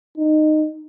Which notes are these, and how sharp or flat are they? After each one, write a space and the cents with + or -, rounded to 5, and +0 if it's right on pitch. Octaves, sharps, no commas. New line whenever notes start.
D#4 -15